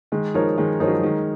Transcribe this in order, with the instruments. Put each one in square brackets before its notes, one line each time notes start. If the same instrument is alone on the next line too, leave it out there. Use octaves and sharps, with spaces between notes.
[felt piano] D#3 [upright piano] G#3
[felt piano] F3 [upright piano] D#4 A#4 C#5
[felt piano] D#3 [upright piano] G#3
[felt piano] F3 [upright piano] D#4 A#4 C#5
[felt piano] F#3
F3
[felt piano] D#3 [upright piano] G#3